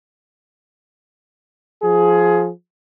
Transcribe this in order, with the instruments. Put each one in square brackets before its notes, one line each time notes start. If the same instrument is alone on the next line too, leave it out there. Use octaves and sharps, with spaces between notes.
[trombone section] F3 G#4